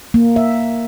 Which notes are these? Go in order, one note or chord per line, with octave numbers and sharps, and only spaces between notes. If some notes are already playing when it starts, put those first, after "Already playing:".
A#3
E5